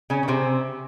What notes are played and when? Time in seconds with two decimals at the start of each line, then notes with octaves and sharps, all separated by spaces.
0.10 C#3 C#4
0.23 C#4
0.28 C3 C4